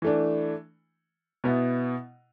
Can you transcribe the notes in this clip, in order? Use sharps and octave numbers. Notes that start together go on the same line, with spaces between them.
E3 A3 D4
B2 B3 E4